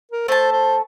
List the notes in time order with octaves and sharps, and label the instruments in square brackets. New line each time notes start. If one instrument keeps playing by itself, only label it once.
[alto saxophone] A#4
[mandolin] A3 A5 [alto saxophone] C5
[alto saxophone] C5